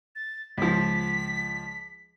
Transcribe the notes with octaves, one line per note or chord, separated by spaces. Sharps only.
A6
C#2 F3 B6